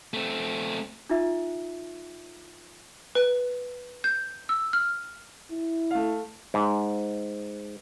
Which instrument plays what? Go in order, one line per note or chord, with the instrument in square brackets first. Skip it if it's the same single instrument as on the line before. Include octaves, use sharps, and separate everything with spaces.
[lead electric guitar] A3 C4
[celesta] D#4 F4 E5
[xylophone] B4
G6
E6
F6
[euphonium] E4
[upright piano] A3 F5
[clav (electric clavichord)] G#2